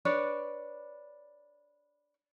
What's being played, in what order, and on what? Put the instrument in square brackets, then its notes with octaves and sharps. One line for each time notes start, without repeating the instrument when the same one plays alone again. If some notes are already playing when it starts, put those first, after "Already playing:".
[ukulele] D4 B4 C#5 D5